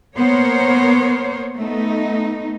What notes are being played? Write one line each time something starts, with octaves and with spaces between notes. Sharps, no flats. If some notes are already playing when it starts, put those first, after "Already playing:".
A#3 B3 A#4 C5 C#5
A3 B3 D#4